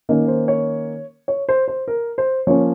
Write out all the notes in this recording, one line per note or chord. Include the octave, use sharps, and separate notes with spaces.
D#3 A#3 C#4 D#4
C5
C#5
C#5
C5
C5
A#4
C5
F3 A#3 C#4 C#5